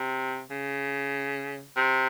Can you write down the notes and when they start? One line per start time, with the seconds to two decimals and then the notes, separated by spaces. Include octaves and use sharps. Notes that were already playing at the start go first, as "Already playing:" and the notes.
Already playing: C3
0.50 C#3
1.76 C3